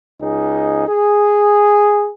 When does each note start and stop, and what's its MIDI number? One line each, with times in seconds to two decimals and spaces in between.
0.21 0.88 37
0.21 0.88 63
0.21 0.88 68
0.88 2.11 68